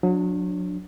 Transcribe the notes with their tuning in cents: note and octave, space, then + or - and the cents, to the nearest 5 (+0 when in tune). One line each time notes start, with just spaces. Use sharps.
F#3 -30 D4 +0